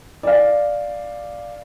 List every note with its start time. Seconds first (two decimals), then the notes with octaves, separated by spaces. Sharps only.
0.23 D5 F5